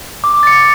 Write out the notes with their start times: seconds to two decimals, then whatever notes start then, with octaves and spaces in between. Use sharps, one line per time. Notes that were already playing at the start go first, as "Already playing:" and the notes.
0.24 D6
0.43 A6 C#7